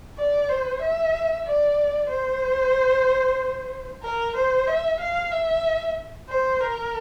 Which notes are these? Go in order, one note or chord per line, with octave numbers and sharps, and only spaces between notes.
D5
C5
E5
D5
C5
A#4
C5
E5
F5
E5
C5
A#4